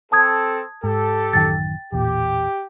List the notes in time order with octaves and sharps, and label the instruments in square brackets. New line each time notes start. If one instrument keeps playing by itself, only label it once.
[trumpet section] C4 A4 [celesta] A5 D#6 G#6
[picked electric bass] G#2 [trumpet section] G4 A4
[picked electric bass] A1 F#2 D#3 [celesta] G5 A6
[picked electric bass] A1 E2 A#2 [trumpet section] G4